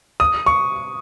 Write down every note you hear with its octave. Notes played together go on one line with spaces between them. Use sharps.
D#6
C#6